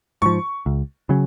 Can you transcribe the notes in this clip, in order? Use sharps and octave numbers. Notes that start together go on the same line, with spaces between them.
G#2 F3 C#6
C#2
C#3 F#3 C#4